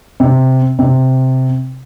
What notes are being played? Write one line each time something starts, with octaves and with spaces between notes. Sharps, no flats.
C3
C3